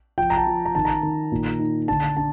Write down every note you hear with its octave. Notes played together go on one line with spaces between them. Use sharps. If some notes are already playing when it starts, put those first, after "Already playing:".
F3 G5
A#5
A5
F3
A#5
D#3 A5
A#5
D#3
A#2
D#4
D3 A5
D4 A5